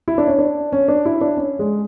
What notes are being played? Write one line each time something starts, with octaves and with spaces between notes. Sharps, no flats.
E4
D4
C#4
D4
C#4
D4
E4
D4
C#4
G#3